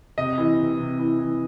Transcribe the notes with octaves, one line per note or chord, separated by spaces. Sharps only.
C3 D#5
E3
C3
C3
E3
E3